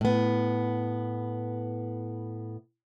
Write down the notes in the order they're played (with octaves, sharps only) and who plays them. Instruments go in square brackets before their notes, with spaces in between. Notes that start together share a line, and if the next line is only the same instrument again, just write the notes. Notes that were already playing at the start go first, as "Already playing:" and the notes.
[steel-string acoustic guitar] A2 B3